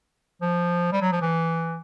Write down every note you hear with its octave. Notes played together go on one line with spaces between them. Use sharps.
F3
G3
F#3
F3
E3